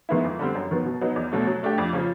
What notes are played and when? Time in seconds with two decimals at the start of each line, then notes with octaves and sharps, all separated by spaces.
0.09 D#3 G#3 B3 E4
0.24 F2
0.39 D3 G3 C4
0.55 F#2
0.71 D#3 F#3 B3
0.85 B2
1.01 F#3 B3 D#4
1.16 E2
1.32 B2 F#3 A3
1.47 F#3
1.63 A3 D4 G4
1.78 F2
1.93 C#3 F3